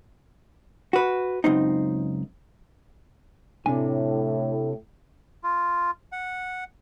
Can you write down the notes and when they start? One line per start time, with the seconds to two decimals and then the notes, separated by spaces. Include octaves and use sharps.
0.93 F#4 B4
1.44 C#2 F#2 C4 D#4
3.66 A2 C3 D4 G#5
5.44 F4
6.12 F#5